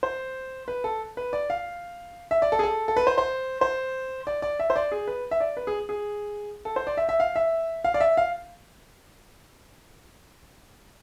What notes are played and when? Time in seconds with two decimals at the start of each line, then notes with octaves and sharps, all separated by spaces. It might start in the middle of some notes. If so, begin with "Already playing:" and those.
0.03 C5
0.68 B4
0.84 A4
1.17 B4
1.33 D5
1.50 F5
2.31 E5
2.42 D5
2.52 A4
2.59 G#4
2.64 A4
2.88 A4
2.96 B4
3.07 C5
3.18 C5
3.61 C5
4.27 D5
4.42 D5
4.59 E5
4.70 C5
4.76 D5
4.92 G#4
5.08 B4
5.31 E5
5.40 D5
5.57 B4
5.67 G#4
5.89 G#4
6.65 A4
6.76 C5
6.87 D5
6.97 E5
7.09 E5
7.20 F5
7.36 E5
7.84 F5
7.94 D5
8.00 E5
8.17 F5